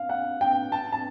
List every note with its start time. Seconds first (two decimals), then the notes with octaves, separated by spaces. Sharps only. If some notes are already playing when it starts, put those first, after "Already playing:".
Already playing: F5
0.09 F#5
0.41 G5
0.72 A5
0.92 A5